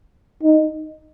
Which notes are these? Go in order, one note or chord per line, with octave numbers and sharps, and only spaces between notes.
D#4